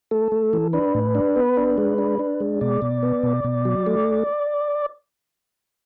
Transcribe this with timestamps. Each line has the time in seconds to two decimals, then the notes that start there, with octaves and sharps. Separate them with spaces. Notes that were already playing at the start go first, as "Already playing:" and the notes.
0.11 A3 A4
0.32 A3
0.53 E3
0.73 D4 B4
0.94 A2
1.15 D4
1.36 B3
1.57 D4
1.78 G#3
1.98 D4
2.19 D4
2.40 G#3
2.61 B2 D5
2.82 B2
3.03 B3
3.23 B2
3.44 B2
3.65 F#3
3.86 A3